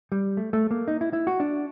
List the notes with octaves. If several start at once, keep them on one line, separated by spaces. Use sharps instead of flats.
G3
A3
A3
A#3
D#4
E4
E4
F#4
D4